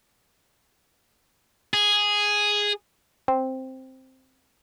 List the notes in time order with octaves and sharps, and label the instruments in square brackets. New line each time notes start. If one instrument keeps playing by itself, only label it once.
[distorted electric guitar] G#4
[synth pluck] C4